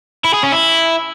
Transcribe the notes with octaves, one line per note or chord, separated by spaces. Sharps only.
E4
G#4
C#4
E4